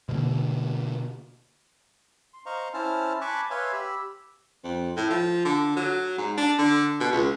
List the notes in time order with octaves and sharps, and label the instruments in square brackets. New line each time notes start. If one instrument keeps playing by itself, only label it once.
[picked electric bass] B2 D3 A#3
[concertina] C6
C5 D#5 F5 A#5 C6 C#6
C#4 E4 C5 A5 F6
G#5 A5 B5 C#6 D6 F#6
B4 C#5 E5 F5 G#5 C6
G4 B5 E6
[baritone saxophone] F2
A2
F3
D3
F#3
G#2
D4
D3
B2
C#2